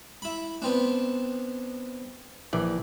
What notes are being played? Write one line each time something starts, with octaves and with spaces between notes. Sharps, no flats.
E4 B5
B3 C4 D4
A#1 E3 D5